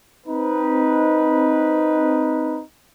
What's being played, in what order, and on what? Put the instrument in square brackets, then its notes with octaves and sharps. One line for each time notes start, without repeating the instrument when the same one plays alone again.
[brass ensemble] C4 D#4 B4